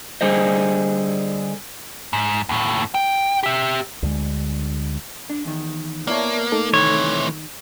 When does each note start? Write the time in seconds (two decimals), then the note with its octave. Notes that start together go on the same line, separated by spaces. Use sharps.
0.21 D3 G3 G#4 C5 D#5
2.13 G#2
2.49 D#2 A2
2.94 G5
3.43 G4 E5
4.03 D2 D3 G#3
5.30 D4
5.45 E2 D#3
6.07 A#3 B3 E4 C#5 D5 E5 A5
6.52 A3 D#4 A4
6.74 C3 D#3 E3 C#5